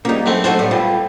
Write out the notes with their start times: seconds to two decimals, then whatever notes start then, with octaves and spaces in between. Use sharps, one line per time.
0.05 C#3 F3 G3 A#3 D#4
0.26 F#2 E3 A3 C4
0.44 E3 A3 C4 D#4 F#4 A4 C5
0.59 A2 G3 B3
0.71 G3 F4 B4 G5